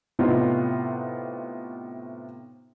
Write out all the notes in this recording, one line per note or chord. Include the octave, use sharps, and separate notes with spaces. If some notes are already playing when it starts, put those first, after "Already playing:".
A2 C3 B3 D#4 F4